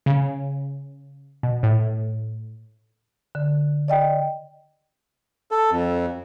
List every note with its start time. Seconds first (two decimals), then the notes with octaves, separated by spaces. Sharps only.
0.06 C#3
1.43 B2
1.63 A2
3.35 D3
3.88 D5 D#5 G5
5.51 A4
5.71 F2